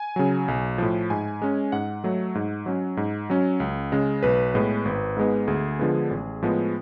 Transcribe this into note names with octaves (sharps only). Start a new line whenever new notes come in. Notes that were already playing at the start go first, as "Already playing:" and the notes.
Already playing: G#5
C#3 F#3
B1
A2 F3
G#2 G#5
G#3 C#4
G#2 F#5
F#3 A3
G#2
F#3 C#4
G#2
F#3 C#4
C#2
C#3 G#3
B1 B4
A2 G#3 B3
G#1
G#2 G#3 B3
D2 G#4
D3 F3 G#3 B3
A1
A2 F3 G#3 B3